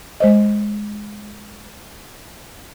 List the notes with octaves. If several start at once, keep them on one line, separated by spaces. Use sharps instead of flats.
G#3 C5 D#5